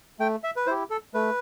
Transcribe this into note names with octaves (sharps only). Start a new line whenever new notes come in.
A3 G5
E5
B4
E4 G4 C5
A4
A3 B4